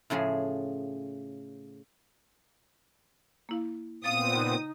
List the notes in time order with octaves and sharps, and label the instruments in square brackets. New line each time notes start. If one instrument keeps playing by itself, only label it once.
[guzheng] A2 C#3 F3 G#4
[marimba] A#3 E4 F5
[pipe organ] A#2 B3 C4 [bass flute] F5 [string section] D#6 [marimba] A6
[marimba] C#3 G5 F#6 [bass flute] D#4